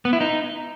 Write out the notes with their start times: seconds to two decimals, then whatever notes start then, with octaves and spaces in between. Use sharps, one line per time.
0.05 B3
0.13 E4
0.21 D#4